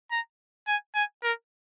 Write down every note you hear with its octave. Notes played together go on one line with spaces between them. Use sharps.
A#5
G#5
G#5
A#4